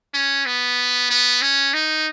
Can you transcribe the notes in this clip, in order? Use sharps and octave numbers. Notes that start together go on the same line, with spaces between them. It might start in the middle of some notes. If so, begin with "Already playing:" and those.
C#4
B3
B3
C#4
D#4